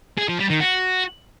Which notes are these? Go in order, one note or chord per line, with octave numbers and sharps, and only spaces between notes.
G#4
F3
G3
D#3
F#4